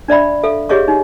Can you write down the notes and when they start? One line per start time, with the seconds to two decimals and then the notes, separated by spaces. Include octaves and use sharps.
0.08 D4 D5 E5 B5
0.43 A4 E5 F5
0.69 G4 G#4 C#5 D#5 F5 C#6
0.88 D#4